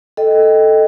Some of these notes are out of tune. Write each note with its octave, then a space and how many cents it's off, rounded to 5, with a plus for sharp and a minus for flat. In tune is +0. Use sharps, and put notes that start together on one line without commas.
A4 +0 D#5 +0 G5 +0